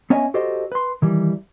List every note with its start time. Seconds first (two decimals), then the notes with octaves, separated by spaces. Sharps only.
0.10 B3 C#4 C#5 D#5 E5 G#5
0.34 F#4 G4 A4 C5 D#5
0.72 B4 C6
1.02 D#3 E3 G3